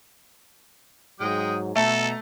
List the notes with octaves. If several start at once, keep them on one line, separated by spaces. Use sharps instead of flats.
G#2 F#3 G#3 G5 D#6
B2 A3 A4 A#5